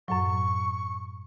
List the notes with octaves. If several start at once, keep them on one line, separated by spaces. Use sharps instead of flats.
F#2 A2 F#3 C#6